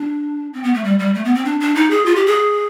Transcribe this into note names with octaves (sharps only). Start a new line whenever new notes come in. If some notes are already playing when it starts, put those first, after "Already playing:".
Already playing: D4
C4
B3
A3
G3
G3
A3
B3
C4
D4
D4
D#4
G#4
F4
G4
G#4